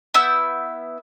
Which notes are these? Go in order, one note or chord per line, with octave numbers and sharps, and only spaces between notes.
B3 E4 E6 G6